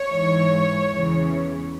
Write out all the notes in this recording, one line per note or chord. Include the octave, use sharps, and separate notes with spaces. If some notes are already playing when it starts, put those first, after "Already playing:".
Already playing: C#5
G#2 E3
E2 C#3 E3